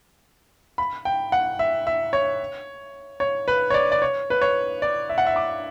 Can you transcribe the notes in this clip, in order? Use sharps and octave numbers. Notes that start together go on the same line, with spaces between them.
B5
G5
F#5
E5
E5
C#5
C#5
B4
C#5
D5
D5
C#5
B4
C#5
D5
E5
F#5
E5
D6